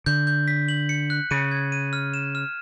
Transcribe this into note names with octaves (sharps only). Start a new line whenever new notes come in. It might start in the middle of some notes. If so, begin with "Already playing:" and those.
D3 G6
G6
B6
F#7
C#7
F#6
C#3 D#7
G#6
D#7
F6
E7
F6